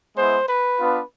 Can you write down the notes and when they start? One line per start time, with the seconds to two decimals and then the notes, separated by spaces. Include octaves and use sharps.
0.17 G#3 B3 E4 C5
0.48 B4
0.78 B3 D4 F4